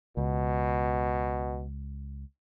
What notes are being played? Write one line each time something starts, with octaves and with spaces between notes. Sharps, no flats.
C#2 B2